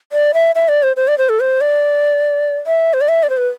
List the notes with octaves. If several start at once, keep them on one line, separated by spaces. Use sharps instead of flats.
D5
E5
E5
D5
C5
C5
D5
C5
A4
C5
D5
E5
C5
D5
E5
D5
C5
B4